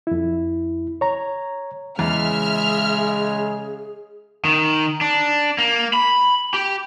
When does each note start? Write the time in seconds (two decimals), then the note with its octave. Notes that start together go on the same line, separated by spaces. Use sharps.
0.07 F2 E4
1.01 C#5 A#5
1.99 E2 C#3 G#3 G#4 E5 F6
4.45 D#3
5.01 D4
5.58 A#3
5.94 B5
6.54 G4